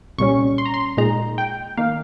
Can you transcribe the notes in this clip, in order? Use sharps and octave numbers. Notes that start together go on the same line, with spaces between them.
C2 A#2 G3 C#4 C#6
C6
A#5
C6
A#2 G#3 D#4 A#5
G5
D#3 A#3 F5